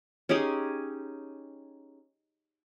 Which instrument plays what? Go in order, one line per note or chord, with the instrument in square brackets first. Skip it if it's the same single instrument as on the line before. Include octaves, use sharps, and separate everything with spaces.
[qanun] C#4 D#4 G4 G#4